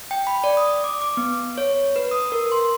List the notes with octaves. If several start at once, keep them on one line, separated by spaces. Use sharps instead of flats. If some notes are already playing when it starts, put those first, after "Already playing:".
G5
B5
D5
D#6
D6
D6
B3
C#5
B4
D#6
A#4
C6